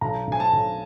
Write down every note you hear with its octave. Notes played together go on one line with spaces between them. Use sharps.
B1 A#5
B1 G#5
A5
B1